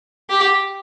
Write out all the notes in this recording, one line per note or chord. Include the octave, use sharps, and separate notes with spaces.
G4